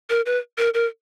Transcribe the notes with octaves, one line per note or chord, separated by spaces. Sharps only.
A#4
B4
A#4
A#4